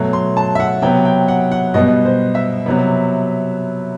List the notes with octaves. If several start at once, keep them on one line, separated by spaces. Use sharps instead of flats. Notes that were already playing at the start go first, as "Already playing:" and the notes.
Already playing: B2 F#3 A3
C6
A5
E5
F#5
C3 F#3 B3 G5
G5
F#5
F#5
B2 G3 B3 D#5
C5
E5
C3 F#3 B3